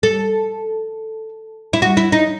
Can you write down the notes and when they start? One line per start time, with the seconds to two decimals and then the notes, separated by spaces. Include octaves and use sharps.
0.03 A4
1.73 E4
1.82 F#4
1.97 E4
2.12 D#4